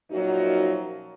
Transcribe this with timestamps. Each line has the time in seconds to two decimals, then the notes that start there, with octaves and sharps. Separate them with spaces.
0.11 F#2 A#2 F3 F#3 D#4 F#4